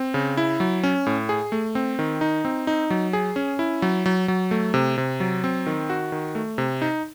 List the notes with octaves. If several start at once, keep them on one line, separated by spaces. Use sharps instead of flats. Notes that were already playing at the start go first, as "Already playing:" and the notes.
Already playing: C4
C#3
E4
F#3
C#4
A2
G#4
A3
C4
D#3
D#4
C4
D#4
F#3
G#4
C#4
E4
F#3
F#3
F#3
A3
C3
C3
F#3
C4
D#3
F#4
D#3
A3
C3
D#4